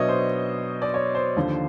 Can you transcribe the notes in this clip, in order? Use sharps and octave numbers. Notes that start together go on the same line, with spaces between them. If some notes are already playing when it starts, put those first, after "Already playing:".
Already playing: B2 F#3 B3 D4 C#5 D#5 E5
C5
D5
C#5
C5
D#2 D3 F3